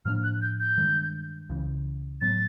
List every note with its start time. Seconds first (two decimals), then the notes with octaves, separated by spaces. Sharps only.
0.05 A2 F3 A#3 D4 F6
0.23 F#6
0.42 G6
0.60 G6
0.78 G2 D#3 G#3
1.50 C#2 C#3 E3
2.21 A2 F#3 B3 A6